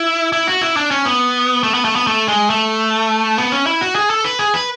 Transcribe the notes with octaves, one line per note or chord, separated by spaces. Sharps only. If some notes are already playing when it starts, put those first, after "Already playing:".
Already playing: E4
E4
F#4
E4
D4
C#4
B3
A3
B3
A3
B3
A3
G#3
A3
B3
C#4
E4
F#4
G#4
A4
B4
G#4
B4